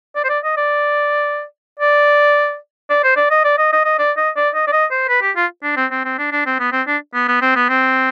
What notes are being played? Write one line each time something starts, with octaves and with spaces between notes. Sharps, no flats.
D5
C5
D5
D#5
D5
D5
D5
C5
D5
D#5
D5
D#5
D#5
D#5
D5
D#5
D5
D#5
D5
D#5
C5
B4
G4
F4
D4
C4
C4
C4
D4
D4
C4
B3
C4
D4
B3
B3
C4
B3
C4